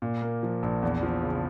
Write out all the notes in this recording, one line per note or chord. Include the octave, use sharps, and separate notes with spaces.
A#2
A#3
F3
A#1
E2
F3
C#3